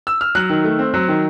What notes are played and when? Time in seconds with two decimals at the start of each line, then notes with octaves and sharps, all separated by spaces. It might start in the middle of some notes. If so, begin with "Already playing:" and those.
0.07 E6
0.21 F6
0.35 F#3 F#6
0.49 D#3
0.64 A3
0.79 C4
0.94 F#3
1.08 D#3